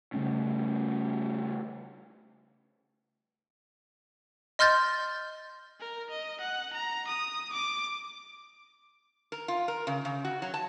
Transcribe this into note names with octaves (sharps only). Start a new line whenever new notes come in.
C#3 G3 A3 C#4
D#5 C6 F6 G6 A6
A#4
D#5
F#5
A#5
D#6
D6
A#4
F4
A#4
C#3
C#3
F#4
F#3
A5